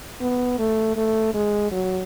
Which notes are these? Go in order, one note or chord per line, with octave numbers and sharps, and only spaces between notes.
B3
A3
A3
G#3
F#3